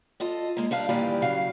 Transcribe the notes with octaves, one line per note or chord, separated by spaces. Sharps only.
F4 A4 D#5
G#3 A#3
G3 D4 F5
A#2 D#3 E3 G3 G4 D5
C#3 F#3 F5